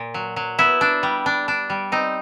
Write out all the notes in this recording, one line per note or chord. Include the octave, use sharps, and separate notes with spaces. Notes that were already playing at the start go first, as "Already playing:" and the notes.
Already playing: A#2
F#3
F#3
B3 E4
D4
G3
D4
D4
G3
C4 D#4